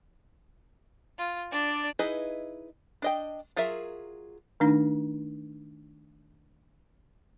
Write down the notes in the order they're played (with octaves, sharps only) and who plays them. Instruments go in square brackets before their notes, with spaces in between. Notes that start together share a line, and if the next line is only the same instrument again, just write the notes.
[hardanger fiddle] F4
D4 D5
[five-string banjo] D#4 E4 G#4 B4 D#5
D4 D#5 G5
F#3 F4 G#4 A#4 E5
[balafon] D#3 A3 D4 D#4